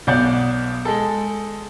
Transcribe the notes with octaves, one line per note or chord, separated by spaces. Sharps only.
B1 B2 D5 F#5 G6
G#3 A4